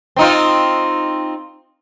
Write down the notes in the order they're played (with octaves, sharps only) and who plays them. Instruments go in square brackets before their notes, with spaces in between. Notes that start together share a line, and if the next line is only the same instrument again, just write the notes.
[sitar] C4 D#4 F4